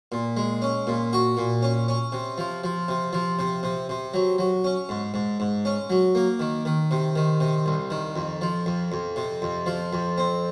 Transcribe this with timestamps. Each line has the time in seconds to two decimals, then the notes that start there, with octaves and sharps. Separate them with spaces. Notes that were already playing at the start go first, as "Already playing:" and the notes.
0.12 A#2
0.37 G#3
0.62 C#4
0.87 A#2
1.13 F#4
1.37 A#2
1.62 C#4
1.88 C#4
2.12 C3
2.38 F3
2.64 F3
2.88 C3
3.13 F3
3.39 C3
3.63 C3
3.89 C3
4.14 F#3
4.38 F#3
4.64 C#4
4.89 G#2
5.14 G#2
5.40 G#2
5.65 C#4
5.90 F#3
6.15 A#3
6.40 D#3
6.65 D#3
6.91 C3
7.15 D#3
7.40 C3
7.66 C2
7.90 D#3
8.16 F2
8.41 F3
8.66 F2
8.92 F2
9.16 C3
9.42 F2
9.66 F3
9.93 F2
10.18 C4